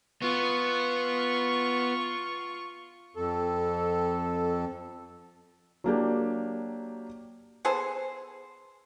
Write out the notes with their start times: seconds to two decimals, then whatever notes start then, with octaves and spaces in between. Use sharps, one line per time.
0.22 B3 F4 C#6
3.16 F2 A4
5.84 F#3 A#3 D4 G4
7.65 B3 G#4 A4 C5